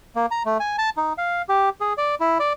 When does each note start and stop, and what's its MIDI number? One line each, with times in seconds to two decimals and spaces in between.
0.16 0.26 58
0.31 0.43 82
0.45 0.58 57
0.60 0.76 80
0.78 0.90 81
0.97 1.13 63
1.18 1.42 77
1.49 1.69 67
1.81 1.93 68
1.98 2.15 74
2.20 2.38 64
2.40 2.53 74